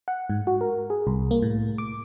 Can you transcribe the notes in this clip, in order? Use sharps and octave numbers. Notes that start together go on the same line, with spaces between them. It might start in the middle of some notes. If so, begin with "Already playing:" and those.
F#5
G#2
F#4
A#4
G#4
C2
A#3
A2
D6